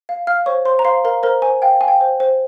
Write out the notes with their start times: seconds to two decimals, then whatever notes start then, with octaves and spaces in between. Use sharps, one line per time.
0.09 F5
0.27 F5 F6
0.46 C5 C#5 C#6
0.65 C5 C6
0.79 A#5
0.85 C5 F5 C6
1.04 A#4 F5 A#5
1.23 A#4 C5 A#5
1.42 C5 G#5
1.62 F5 G5
1.81 F5 G#5
1.88 G5
2.01 C5
2.20 C5